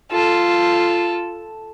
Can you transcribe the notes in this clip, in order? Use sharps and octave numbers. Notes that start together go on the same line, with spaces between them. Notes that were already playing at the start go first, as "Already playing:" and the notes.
F4 A4